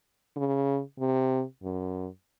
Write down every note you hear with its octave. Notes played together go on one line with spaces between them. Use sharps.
C#3
C3
F#2